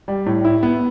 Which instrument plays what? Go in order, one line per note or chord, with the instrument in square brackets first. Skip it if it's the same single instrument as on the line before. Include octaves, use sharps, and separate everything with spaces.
[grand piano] G3
A2
E4
B3